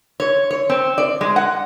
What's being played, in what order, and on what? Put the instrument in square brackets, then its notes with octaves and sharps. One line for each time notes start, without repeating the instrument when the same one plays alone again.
[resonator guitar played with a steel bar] C#5
C#5
C4
D5
G#3
F#5